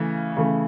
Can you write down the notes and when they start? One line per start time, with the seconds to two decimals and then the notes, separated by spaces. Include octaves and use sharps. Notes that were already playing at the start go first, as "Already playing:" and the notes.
Already playing: C#3 E3 A3
0.37 C#3 E3 A3